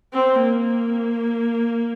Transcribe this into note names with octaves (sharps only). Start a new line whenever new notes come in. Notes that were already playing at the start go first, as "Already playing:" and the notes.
C4
A#3